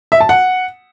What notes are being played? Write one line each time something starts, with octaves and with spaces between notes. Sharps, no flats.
E5
A5
F#5